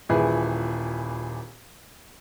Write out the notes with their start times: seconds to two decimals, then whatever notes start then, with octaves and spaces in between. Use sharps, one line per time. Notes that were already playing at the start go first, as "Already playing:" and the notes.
0.09 D#1 A#2 E3 E4 G#4 B4